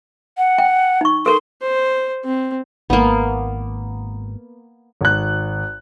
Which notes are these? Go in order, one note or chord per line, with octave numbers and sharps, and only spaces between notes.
F#5
G5
D#4 C#6
A4 A#4 C6
C5
C4
G#1 A#3 B3
G#1 F#6